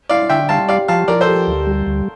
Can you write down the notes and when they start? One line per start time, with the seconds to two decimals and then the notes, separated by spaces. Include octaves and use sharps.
0.09 E4 D5 F5
0.29 D3 E5 G5
0.49 G3 F5 A5
0.68 G4 D5 F5
0.88 F3 F5 A5
1.08 F3 A#4 D5
1.21 A4 C5
1.28 G4
1.47 D2
1.67 G3
1.86 D2